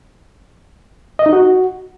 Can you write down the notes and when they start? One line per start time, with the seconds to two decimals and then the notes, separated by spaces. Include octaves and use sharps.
1.19 D#5
1.26 D#4
1.33 F#4